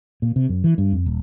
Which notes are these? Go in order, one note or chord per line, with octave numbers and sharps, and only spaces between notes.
A#2
C3
F#2
E3
G2
F2
D#1